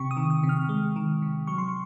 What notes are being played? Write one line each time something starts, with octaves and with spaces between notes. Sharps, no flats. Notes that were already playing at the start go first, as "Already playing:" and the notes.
Already playing: C3 C#6
D#6
D#3
D#6
C3
F6
G#3
D#3
C3
F#3 C#6
C6
C#6